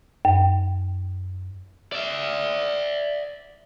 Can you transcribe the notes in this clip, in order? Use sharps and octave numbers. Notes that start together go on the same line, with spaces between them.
F#2
D5 E5